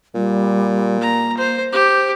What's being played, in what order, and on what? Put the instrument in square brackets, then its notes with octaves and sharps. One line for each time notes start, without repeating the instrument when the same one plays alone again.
[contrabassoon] A#2 [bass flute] G3
[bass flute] A#3 [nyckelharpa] A#5
[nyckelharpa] C5
[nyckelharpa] G4 [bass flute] C5